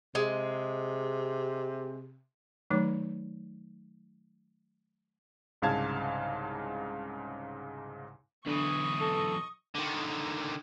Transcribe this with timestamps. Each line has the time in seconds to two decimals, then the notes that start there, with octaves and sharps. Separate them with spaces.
0.15 C3 G#3
2.70 D#3 F#3 A3 D#4 C#5 D6
5.62 C2 G#2 C#3 F5 A5 G#6
8.46 B1 D3 E3 D#5 C#6
9.01 A4
9.75 D3 D#3